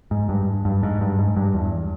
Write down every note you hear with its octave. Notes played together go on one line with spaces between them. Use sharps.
G#2
G2
G2
G#2
G2
G#2
G2
E2